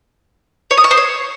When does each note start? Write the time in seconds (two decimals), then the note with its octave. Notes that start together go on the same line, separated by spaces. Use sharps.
0.71 C#5
0.77 D#6
0.84 C#6
0.91 C5
0.97 C#5